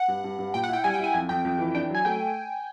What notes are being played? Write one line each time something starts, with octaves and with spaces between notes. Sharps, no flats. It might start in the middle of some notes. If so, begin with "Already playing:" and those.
Already playing: F#5
G2
G2
G2
A#2 G5
F#5
E4
G5
G3 G#5
G5
E4
G#5
F2 G#5
F2 G5
F2
E3
D4 G5
F#3 G#5
A3 G5